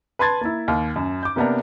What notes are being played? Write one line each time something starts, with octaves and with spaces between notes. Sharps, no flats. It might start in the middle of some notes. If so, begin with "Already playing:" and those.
B4 A5 C6 G#6 A6
A#3 E4
D#2 F6
F#2
D6 G6
C3 A#3 B3 D4 A#4